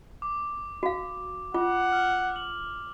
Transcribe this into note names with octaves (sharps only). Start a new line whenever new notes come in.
D6
F#4 F5
F4 F#5 D6
F6
F#7